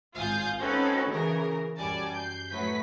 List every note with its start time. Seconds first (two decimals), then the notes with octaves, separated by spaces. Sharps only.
0.14 G#1 F4 F5 G#5 D#6 G6
0.59 C4 C#4 D#4 F#4 A4 B4
1.10 C#3 E3 C#4 A#4
1.77 F#2 G3 D5 G#5 A5
2.16 G6 C7
2.50 A2 F#3 B4 B6